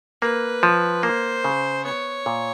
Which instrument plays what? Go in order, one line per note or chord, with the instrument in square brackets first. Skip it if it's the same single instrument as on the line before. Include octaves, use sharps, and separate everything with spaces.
[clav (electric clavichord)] A#3 [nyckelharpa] B4
[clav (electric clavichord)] F3
[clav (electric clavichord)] A#3 [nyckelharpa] C5
[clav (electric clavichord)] C#3
[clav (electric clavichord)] B3 [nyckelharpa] C#5
[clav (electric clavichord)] A#2